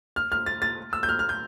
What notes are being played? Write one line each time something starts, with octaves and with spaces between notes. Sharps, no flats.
F6
F6
A6
A6
E6
G6
F6
F6
G6